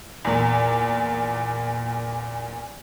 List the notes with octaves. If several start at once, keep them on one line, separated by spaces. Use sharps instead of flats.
E2 A#2